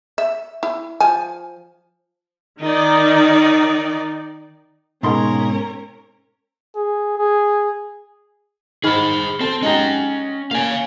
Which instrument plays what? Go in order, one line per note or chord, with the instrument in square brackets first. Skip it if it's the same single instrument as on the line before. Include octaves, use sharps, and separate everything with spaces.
[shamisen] E5
E4
F3 G#5
[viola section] D#3 D#4 D5
[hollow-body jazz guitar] G#2 C6 [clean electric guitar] B2 D#4 G#4 [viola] C#4 A#4
[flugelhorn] G#4
G#4
[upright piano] D#3 B5 F6 [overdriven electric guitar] G#4 C5
[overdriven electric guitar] C4 [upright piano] A4
[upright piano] G#3 D#4 G4 [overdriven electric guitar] C#4 A#5
[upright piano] A#3 C#4 [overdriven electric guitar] F5 G#5